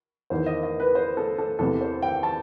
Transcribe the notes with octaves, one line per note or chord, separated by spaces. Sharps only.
E2 D#3 C5
D#5
D#5
B4
C5
A4
A4
E2 C3 E3 A4
C5
G5
A5